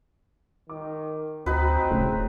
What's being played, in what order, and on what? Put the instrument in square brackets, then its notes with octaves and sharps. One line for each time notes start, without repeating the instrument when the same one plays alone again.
[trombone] D#3 [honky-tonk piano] D6
[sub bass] D2 [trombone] C4 [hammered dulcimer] D#4 B4 [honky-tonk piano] F#4 D#5 D#6
[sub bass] D1 [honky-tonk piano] A2 C#3 A3